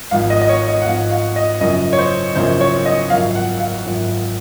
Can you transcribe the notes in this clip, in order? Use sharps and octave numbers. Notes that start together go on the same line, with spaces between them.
G#1 G#2 F3 F5
D#5
D#5
C#5
D#5
F#5
G#1 G#2 F3 F5
F5
D#5
F#1 F#2 C#3 F3 D#5
C#5
C5
F#1 F#2 C#3 F3 C5
C#5
D#5
G#1 F#2 F3 F5
F#5
F5
G#1 F#2 F3